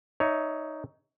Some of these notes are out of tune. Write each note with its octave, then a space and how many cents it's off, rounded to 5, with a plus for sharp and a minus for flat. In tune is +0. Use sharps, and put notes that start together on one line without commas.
D#4 +0 C#5 +15 E5 -10